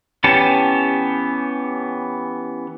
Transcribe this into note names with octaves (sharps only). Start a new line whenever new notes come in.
E3 B3 C#4 G4 A5